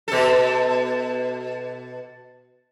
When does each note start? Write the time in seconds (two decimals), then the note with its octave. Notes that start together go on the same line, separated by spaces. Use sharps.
0.08 B2 A4